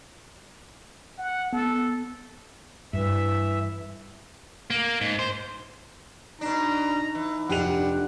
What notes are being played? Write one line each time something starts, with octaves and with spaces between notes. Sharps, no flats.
F#5
B3 A4
G2 E3 E5
A#3
G#2
C5
B2 D4 D#4 A#5
E3
F1 D4 G4 F#5 F7